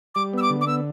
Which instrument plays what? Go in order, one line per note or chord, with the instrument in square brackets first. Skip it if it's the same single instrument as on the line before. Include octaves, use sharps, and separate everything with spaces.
[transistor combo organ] G3 [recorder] D6
[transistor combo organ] B3 [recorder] E6
[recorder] D6
[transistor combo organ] D3
[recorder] D6
[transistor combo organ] B3 [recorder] E6